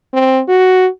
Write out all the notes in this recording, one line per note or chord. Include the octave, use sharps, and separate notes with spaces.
C4
F#4